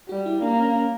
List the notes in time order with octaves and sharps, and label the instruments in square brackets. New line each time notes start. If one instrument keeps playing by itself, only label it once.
[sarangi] G3 [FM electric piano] F#4
[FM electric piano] E4
[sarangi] A#3 [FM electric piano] D4
[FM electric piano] C#4
C#4